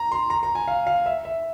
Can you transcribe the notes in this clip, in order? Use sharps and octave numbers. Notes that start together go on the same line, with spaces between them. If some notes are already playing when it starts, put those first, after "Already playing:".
Already playing: A#5
C6
A#5
A#5
G#5
F5
F5
E5
E5